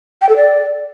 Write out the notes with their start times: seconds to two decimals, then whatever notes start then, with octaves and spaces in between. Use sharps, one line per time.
0.22 G5
0.29 A4
0.36 D5